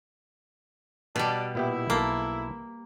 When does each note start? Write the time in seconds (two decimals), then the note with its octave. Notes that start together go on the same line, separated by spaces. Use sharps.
1.16 B2 G3 D4 G4
1.55 A#2 B3 E4 G4
1.90 B1 A#3 A4 B4